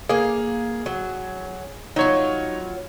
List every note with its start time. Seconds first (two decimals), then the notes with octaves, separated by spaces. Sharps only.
0.09 A#3 G#4 F5
0.86 F#3
1.96 F#3 D#4 F4 C#5